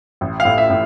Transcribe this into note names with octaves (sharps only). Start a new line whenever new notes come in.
A1
F5
A2
E5
A2